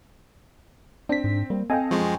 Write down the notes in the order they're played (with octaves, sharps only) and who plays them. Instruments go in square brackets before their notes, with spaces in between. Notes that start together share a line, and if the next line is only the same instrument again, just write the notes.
[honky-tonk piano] C4 [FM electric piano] D4 B6
[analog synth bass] G#2
[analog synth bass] G3 [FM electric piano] A#3
[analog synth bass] C4 [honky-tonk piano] A4 D#5 F5 [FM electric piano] G5 G#5
[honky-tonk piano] F#2 D#5 C#6 [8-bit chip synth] F3 G#3